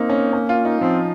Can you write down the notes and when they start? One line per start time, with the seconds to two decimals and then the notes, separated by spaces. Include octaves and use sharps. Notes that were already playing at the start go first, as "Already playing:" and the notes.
Already playing: A#3 C4 D#4
0.10 C#4
0.33 C#4
0.49 F4
0.65 D#4
0.80 F3 C4